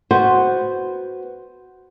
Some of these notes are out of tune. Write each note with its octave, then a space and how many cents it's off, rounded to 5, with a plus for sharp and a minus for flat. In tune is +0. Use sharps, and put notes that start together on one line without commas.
B3 +0 F#4 +0 C5 +0